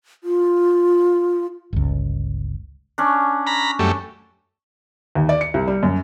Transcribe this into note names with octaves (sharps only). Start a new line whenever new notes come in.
F4
G1 C#2
C#4 D4
A#5 B5
F#2 G3 A3
D#2
D5
C#7
C2
G3
F#2